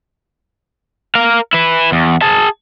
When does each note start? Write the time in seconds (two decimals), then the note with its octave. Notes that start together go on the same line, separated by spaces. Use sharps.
1.15 A#4 F5
1.53 E4 B4
1.92 E2
2.22 G#4 A5